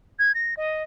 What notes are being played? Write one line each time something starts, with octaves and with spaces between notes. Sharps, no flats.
G#6
A#6
D#5